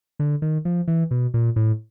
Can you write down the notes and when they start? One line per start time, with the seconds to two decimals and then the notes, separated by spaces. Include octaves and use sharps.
0.19 D3
0.42 D#3
0.65 F3
0.88 E3
1.11 B2
1.34 A#2
1.56 A2